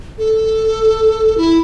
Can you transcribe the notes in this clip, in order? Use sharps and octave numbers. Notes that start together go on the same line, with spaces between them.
A4
E4